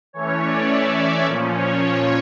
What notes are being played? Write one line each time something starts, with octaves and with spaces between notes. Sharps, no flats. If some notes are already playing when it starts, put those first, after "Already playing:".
E3 A3 C#4 C#5
D5
E5
D5
A#2 F3 C#4
C#5